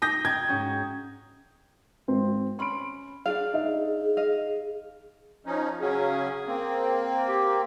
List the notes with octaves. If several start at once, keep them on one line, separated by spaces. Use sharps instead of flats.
D#4 D#6 G6 A#6
G5 A#5 G#6
G#2 C#4 F#4
G#1 C4
C#4 B5 C6 D7
D4 F4 G#4 F5
D#4 E5
D#5 F5
F3 C#4 D#4
C#3 F#3 C#4 G#4
A#3 C4
G4